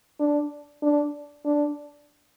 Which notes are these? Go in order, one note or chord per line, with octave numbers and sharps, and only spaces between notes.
D4
D4
D4